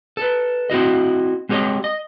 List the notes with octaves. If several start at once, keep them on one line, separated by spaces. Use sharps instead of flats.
A4 B4
C4 E4 F#4 D#5
G#3 C4 G4 C#5 D#5
D#5